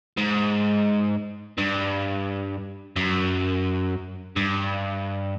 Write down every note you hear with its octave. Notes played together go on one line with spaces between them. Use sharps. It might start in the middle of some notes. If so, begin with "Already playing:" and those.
G#2
G2
F#2
G2